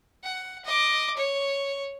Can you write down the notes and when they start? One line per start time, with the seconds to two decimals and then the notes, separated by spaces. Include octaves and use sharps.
0.23 F#5
0.65 D#5 D6
1.17 C#5